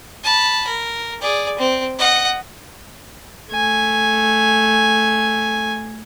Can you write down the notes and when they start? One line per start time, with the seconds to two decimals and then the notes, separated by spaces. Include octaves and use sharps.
0.24 A5 B5
0.67 A#4
1.21 G#4 D5
1.59 C4
1.98 D#5 F#5
3.52 A3 G#5